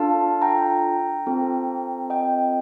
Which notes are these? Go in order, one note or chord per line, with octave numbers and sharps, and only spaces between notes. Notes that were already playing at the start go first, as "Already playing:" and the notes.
Already playing: D4 F4 A4 F5 A5
G5 A#5
C4 F4 A4
D#5 G5